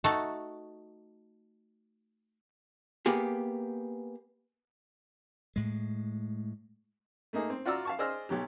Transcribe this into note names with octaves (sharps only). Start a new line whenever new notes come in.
A3 D#4 F#4 A4 A5
A#3 B3 G4 G#4
A2 G#3
A3 A#3 D#4 G#4
C4
F4 F#4 D5 A#5 E6
F5 A5 C#6
G#4 C5 D5 D#5 E6 F6
B1 B2 F#3 G4